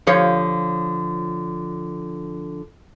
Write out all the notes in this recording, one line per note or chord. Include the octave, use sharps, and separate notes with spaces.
D3 F3 C#5